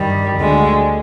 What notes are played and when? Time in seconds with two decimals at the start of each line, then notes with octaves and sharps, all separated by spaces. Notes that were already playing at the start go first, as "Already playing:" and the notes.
Already playing: G2 D#3 G3
0.36 D2 D3 G#3